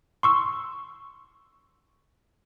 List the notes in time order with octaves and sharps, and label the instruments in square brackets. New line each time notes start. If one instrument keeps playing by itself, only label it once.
[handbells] C6 C#6 E6